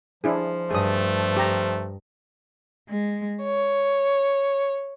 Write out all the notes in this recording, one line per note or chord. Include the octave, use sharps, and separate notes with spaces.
F3 D4 E4 G#4
G2 A3 G#4 D#6
G4 A#5
G#3
C#5